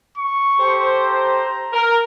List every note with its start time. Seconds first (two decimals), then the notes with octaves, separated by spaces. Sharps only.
0.18 C#6
0.59 G4 A4 C5
1.06 A#5
1.73 A#4